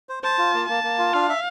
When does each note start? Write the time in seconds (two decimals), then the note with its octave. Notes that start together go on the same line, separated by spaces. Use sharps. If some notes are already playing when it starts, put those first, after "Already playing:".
0.09 C5
0.23 C5 A5
0.38 F4
0.54 A#3
0.69 A#3 A5
0.83 A#3
0.98 F4
1.14 D4 F5
1.29 E5